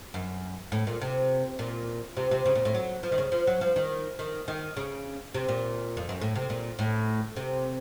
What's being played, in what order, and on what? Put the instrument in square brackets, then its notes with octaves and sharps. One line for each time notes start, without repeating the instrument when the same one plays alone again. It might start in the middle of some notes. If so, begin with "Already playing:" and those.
[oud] F#2
A2
A#2
C3
A#2
C3
C3
C#3
A#2
A2
F#3
F3
D#3
C#3
F3
F#3
F3
D#3
D#3
D#3
C#3
C3
A#2
F2
F#2
A2
C3
A#2
A2
C3